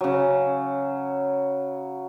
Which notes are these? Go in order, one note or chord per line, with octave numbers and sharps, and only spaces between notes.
C#3 F#3